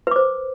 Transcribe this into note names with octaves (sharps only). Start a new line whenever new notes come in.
B4 C5 D6